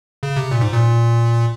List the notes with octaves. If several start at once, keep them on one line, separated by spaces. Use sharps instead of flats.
C#3
C3
A#2
G#2
A#2